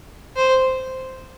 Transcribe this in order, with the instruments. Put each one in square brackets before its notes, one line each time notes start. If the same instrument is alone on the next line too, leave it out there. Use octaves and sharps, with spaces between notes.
[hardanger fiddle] C5